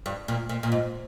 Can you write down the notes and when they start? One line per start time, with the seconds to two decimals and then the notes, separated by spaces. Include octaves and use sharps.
0.06 G2
0.28 A#2
0.49 A#2
0.63 A#2
0.72 G#2